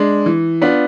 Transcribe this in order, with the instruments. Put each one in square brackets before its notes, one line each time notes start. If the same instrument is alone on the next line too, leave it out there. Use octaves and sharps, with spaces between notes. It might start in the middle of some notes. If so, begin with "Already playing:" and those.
Already playing: [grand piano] G#3 D4
E3
B3 D4 F4